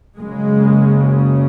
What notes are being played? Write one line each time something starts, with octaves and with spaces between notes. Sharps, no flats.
F#1 F#2 C#3 G#3